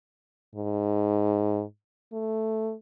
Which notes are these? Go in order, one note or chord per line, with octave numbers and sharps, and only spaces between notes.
G#2
A3